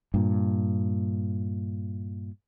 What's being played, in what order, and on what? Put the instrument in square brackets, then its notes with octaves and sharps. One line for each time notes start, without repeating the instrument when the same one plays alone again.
[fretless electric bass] G2 A#2